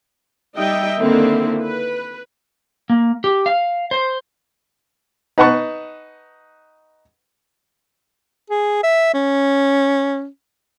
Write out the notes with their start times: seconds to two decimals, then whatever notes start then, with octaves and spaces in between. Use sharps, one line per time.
0.56 G3 D#4 D#5 E5 G5
0.99 D3 D#3 A#3 C4 E4
1.63 B4
2.90 A#3
3.24 G4
3.46 F5
3.91 C5
5.38 D#4 B4 F#5 A5 C#6
8.50 G#4
8.83 E5
9.14 C#4